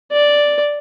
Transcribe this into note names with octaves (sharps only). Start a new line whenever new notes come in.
D5